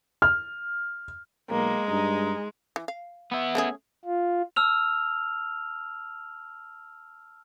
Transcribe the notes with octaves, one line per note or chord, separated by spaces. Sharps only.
F6
B1 G#3 A#3
G2 D#4
E3
F5
B3 E4
A3 C#4 G#4
F4
A5 E6 F6 F7